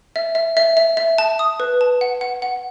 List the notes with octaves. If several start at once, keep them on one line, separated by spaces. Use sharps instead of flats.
E5
E5
E5
E5
E5
A5
D#6
B4
A5
F#5
F#5
F#5